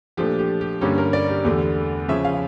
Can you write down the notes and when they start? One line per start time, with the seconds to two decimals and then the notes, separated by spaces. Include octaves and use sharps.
0.17 A#2 F3 A3 D4 G4
0.39 G4
0.61 G4
0.81 G2 D3 G3 A#3 C#4 G4
0.98 A#4
1.13 D5
1.30 G4
1.45 E2 D3 A3 G4
2.08 C#3 F3 C#4 E5
2.25 F5